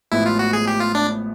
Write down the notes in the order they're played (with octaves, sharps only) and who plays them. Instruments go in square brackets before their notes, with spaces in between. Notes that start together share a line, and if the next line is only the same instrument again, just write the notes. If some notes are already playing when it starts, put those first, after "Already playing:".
[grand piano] A1 A2 F3 G#3 B3 [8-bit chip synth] E4
[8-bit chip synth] F4
F#4
G#4
G4
F4
D4